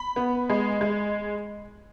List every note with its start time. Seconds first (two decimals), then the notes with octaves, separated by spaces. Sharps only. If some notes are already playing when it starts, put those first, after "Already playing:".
Already playing: B5
0.16 B3
0.49 G#3
0.81 G#3